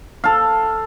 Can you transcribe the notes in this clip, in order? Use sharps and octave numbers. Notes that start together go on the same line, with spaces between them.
A4 F5